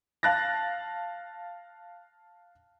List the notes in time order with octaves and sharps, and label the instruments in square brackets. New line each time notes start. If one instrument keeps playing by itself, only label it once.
[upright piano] F5 A5 F#6 A6 A#6